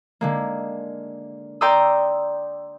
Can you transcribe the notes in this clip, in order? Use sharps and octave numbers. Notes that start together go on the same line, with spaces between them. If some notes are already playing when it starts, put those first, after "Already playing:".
D3 G#3 A#3
D5 G5 A#5 C6 D#6 E6